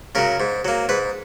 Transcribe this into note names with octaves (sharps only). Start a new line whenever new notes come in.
C#3 F#3 A#4
G#2
F#3 A#3
G#2 B4